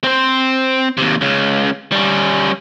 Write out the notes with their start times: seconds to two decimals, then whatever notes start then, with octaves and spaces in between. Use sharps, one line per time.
0.04 C4 C5
0.97 D#2 C3
1.21 C#2 C#3
1.92 G3 C#4